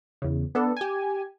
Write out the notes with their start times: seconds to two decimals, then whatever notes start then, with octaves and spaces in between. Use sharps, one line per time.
0.22 E2 C#3
0.55 B3 D4 A4
0.77 G4 G#5